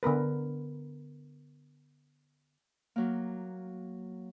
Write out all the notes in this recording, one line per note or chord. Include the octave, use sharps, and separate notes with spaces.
D3 B3 A#4 B4
F#3 A#3